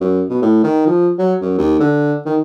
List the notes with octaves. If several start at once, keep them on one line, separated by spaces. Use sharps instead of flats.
F#2
B2
A2
D#3
F3
F#3
F#2
D#2
D3
D#3